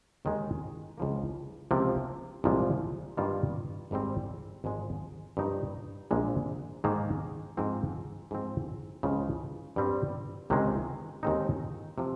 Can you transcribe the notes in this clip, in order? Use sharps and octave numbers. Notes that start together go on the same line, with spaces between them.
D#2 D#3 G#3
C#2 C#3 F3 A#3
C#2 C3 F3 A#3
C2 A#2 F3 G#3
G2 D#3 A#3 F4
G#1 G#2 G3 C4
G#1 G#2 F3 G#3
G2 F3 A#3 D#4
A#1 A#2 G#3
G#2 D#3 A#3
G#2 F3 C4
G#2 F3 C4
C#2 C#3 F3
G2 G3 C4
C#2 C3 D#3 G#3 C#4
D#2 D#3 G#3 C4 D#4
C3 F3